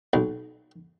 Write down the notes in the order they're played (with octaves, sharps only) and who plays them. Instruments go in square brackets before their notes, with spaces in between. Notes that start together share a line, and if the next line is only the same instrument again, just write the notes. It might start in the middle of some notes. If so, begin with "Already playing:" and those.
[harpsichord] B1